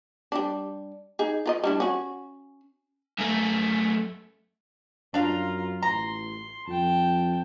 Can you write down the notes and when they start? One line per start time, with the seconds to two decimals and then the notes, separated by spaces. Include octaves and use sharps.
0.32 G3 D4
1.19 D#4 G#4
1.46 F4 B4 D#5
1.64 G3 D4 E4
1.80 C#4 F#4
3.18 F#2 A3
5.14 F#2 D4 F4 F5 A#5
5.82 A1 A#5 C6
6.67 F2 G5 A5